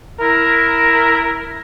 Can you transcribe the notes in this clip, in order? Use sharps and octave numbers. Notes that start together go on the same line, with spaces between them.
E4 A#4